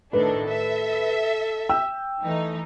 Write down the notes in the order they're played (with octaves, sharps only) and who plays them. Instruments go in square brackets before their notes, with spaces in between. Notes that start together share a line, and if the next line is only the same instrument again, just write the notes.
[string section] A2 D#3 D4 [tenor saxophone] A4 [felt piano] B4
[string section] E5
[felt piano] G5 E6
[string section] E3 D#4 [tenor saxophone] A3